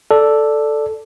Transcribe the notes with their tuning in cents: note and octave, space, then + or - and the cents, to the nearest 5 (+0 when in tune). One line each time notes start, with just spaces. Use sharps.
A4 +0 D5 +0